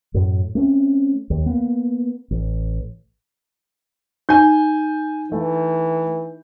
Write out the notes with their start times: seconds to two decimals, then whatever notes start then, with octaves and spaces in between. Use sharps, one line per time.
0.14 F#2 A2
0.55 A3 C4 C#4
1.30 D#2
1.46 A#3 B3
2.31 A1
4.29 D#4 G#5 G6
5.32 E3 A3